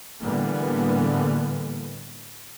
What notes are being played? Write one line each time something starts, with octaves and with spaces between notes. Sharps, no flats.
A2 D3 E3 G3 A#3 B3